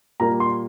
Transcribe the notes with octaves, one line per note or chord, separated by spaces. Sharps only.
A#2 G3 A#3 A#5
C6